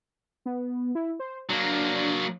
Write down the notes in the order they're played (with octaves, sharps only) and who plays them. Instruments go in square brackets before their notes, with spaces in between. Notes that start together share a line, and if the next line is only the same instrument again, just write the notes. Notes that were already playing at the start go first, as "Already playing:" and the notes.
[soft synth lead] B3
E4
C5
[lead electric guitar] F#3 A#3 [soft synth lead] D4